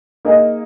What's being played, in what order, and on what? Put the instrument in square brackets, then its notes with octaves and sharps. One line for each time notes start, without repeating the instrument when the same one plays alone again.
[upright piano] A#3 D#4 G#4 D#5